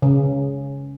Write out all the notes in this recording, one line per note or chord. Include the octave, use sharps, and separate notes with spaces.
C#3